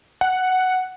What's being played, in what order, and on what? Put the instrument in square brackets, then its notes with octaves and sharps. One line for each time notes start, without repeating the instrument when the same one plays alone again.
[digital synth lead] F#5